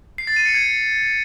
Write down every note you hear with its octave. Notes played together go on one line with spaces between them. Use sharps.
C7
A6
D#7
C#7
G#6